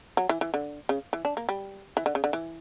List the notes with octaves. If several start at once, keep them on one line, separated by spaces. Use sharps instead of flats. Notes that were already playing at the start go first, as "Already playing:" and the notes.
F#3
E3
E3
D3
C#3
E3
D4
A#3
G3
E3
D3
C#3
D3
E3